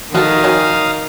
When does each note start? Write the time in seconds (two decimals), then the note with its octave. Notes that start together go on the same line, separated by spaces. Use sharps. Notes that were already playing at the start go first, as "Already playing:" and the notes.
0.15 D#3 F#4 A4 F5 D#6 F6
0.44 F#3 C#4